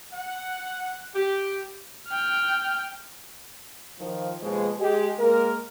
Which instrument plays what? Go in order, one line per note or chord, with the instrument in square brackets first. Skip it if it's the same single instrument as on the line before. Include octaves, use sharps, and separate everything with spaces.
[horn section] F#5
G4
[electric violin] G5 F6
[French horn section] D#3 F3
D#2 B2 F3 G#3
G#3 G4
G#3 A#3 A#4